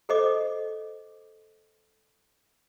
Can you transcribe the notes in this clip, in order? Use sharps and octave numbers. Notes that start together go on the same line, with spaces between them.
A4 C5 D#5 D6